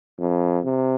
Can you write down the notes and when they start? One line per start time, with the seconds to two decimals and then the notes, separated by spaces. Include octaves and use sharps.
0.18 F2
0.64 C3